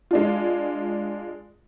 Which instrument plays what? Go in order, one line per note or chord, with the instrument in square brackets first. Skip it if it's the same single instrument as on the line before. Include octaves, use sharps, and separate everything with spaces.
[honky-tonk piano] G#3 D4 F4